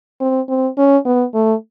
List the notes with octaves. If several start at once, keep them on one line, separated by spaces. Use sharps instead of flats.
C4
C4
C#4
B3
A3